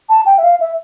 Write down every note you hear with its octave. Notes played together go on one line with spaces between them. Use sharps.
A5
G5
E5
F5
E5